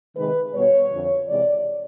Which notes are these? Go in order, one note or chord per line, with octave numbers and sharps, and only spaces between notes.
C3 D#3 G#3 B4
B2 G3 B3 C#5
F2 D3 F3
C3 E3 G#3 D5